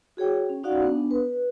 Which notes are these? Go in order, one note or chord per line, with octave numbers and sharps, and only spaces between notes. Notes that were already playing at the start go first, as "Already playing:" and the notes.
F#4 G#4 C#5 G5
C#4
C#4 D#4 F#4 D5 F5 F#5
B3 D4
B4